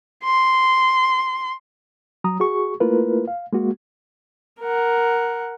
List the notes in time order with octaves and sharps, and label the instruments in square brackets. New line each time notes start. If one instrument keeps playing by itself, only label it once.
[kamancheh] C6
[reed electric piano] F#3 A#5 D#6
F#4 G#4 C#6
A3 A#3 E4 F4 A#4 B4
F5
G#3 A#3 F#4
[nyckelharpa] A#4 F#5